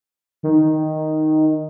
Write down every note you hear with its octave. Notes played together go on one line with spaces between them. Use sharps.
D#3